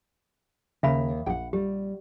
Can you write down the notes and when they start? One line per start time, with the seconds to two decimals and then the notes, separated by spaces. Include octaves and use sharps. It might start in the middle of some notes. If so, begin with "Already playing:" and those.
0.83 D#2 C#3 E5 F5 B5
1.26 A#1 F#5 G5
1.53 G3 G4